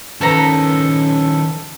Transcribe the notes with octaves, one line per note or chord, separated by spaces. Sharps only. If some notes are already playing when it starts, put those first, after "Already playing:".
D#3 F3 C#4 A4 B4 A#5